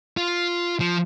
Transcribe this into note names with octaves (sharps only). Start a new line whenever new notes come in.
F4
F3